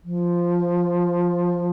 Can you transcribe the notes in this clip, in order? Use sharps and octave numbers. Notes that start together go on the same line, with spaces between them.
F3